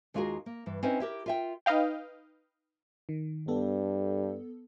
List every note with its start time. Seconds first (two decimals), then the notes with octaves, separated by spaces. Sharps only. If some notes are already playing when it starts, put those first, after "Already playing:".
0.14 D#2 G#3 F4 F#4 G#4 A#4
0.46 A#3
0.66 G2 E3
0.83 C4 C#4 D#4 E4 B4 C5
1.00 E4 G4 A#4
1.26 F4 E5 G5
1.66 D#4 B4 D#5 F5 G5
3.09 D#3
3.48 G2 B3 A4